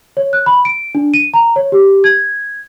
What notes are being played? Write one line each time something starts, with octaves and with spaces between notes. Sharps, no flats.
C#5
F#6
B5
D7
D4
D#7
A#5
C#5
G4
G#6